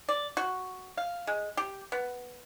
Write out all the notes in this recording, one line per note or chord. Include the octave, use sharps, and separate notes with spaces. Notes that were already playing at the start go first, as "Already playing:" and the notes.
D5
F#4
F5
G#3
G4
B3